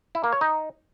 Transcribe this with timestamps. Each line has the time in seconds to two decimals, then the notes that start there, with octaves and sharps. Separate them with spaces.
0.15 E4
0.24 A#3
0.32 C#5
0.41 D#4